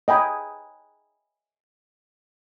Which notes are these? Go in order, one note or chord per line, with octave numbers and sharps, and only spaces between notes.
D#5 G5 G#5 B5